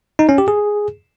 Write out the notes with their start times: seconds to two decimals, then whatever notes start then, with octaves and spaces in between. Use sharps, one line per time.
0.19 D#4
0.29 C#4
0.38 G4
0.48 G#4